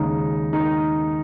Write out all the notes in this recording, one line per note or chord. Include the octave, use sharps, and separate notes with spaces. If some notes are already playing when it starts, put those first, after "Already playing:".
Already playing: D#2 C#3 G#3 D#4
D#4